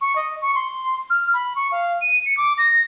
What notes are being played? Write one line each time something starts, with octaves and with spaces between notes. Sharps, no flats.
C#6
D#5
C#6
C6
F6
B5
C#6
F5
D#7
C#7
D6
A#6